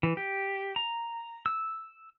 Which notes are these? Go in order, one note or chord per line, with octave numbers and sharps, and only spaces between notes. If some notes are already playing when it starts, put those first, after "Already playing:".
E3
G4
A#5
E6